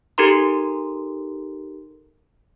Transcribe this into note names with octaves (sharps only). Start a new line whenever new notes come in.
D#4 G4 A4 A#4 A#5 C6